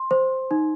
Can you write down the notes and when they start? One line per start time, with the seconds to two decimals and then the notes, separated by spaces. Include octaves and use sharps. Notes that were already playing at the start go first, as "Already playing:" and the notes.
Already playing: C6
0.11 C5
0.51 D#4